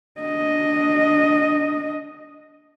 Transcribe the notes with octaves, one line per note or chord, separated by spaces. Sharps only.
D4 D#5